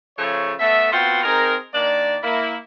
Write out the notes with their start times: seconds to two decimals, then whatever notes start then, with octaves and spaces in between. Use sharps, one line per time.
0.18 C#3 F3 A3 C#5
0.59 A3 B3 A4 E5
0.92 B3 C4 F4 F#4 G5 C6
1.23 C4 D#4 G#4 A#4
1.74 D#3 A#3 D4 D5
2.23 A#3 E4